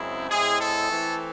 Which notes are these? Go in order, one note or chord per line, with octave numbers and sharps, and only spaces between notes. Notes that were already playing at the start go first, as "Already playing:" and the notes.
Already playing: F#2 C#3 G#3 C4 E4
A2 G#3 C4 E4 G#4
A4
E3 A3 C4 E4